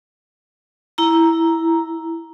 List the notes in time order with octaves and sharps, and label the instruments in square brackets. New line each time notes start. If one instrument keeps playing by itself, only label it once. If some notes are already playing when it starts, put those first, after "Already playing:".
[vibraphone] E4 A#5